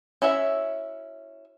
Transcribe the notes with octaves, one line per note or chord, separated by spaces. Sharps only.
C#4 E4 F#4 E5